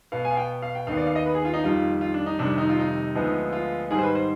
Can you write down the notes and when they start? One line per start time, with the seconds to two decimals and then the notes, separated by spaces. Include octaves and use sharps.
0.12 B2 B3 F5
0.25 G#5
0.31 F5
0.37 G5
0.62 F5
0.75 G5
0.87 D#2 D#3 B3 F5
0.97 D5
1.07 F5
1.16 D#5
1.26 B4
1.35 G#4
1.45 F4
1.54 D#4
1.63 F2 D#3 G3 F4
2.01 F4
2.14 D4
2.26 D#4
2.39 F2 C3 D#3 G3 D4
2.58 D#4
2.69 F4
2.79 D#4
3.15 D2 D3 F3 G#3 B3
3.52 F4
3.91 G#2 D#3 G3 G#4
3.99 C5
4.03 B4
4.15 C5